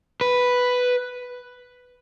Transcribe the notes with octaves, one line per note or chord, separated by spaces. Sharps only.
B4